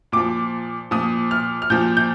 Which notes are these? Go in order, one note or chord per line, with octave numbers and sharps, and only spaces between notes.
A#2 F3 D6
A#2 F3 D#6
F6
F6
A#2 F3 G6
G6